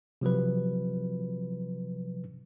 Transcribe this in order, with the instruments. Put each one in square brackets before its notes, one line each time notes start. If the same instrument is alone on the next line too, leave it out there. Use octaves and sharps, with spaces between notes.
[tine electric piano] C3 F3 F#3 B4